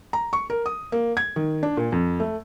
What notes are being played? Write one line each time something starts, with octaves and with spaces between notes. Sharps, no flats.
A#5
C#6
A#4
D#6
A#3
G#6
D#3
D4
A#2
F2
A3